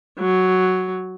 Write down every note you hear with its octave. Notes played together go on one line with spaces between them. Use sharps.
F#3